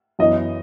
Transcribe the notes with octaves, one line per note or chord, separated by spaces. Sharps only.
F#2 E3 B3 D#5